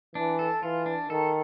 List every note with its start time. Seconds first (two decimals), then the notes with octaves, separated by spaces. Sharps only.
0.15 E3 D4
0.39 A4
0.63 E3 F4
0.86 D4
1.10 D#3 A4